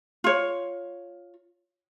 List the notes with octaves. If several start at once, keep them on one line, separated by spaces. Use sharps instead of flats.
F4 C#5